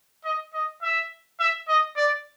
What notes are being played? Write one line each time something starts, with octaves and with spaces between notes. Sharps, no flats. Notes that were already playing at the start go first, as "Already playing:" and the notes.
D#5
D#5
E5
E5
D#5
D5